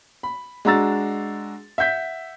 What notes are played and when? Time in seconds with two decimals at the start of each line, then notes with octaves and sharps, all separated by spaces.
0.23 B5
0.65 G#3 D4 F#4 A#5 E6 A6
1.78 E5 F#5 G6 B6